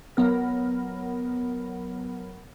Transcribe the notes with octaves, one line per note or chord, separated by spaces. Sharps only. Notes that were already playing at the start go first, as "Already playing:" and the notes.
F#3 B3 A#4